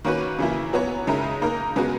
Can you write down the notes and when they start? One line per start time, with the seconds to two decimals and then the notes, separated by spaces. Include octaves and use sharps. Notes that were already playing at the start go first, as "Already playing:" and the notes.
0.05 D#3 A#3 C#4 F#4 B4
0.39 C#3 E3 A#3 E4
0.73 F#3 B3 F#4 C#5
1.07 C#3 G#3 D#4 A#4 E5
1.42 A#3 D#4 A#4
1.76 C#3 G#3 B3 F#4